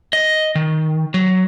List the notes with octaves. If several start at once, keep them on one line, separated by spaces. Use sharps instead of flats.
D#5
D#3
F#3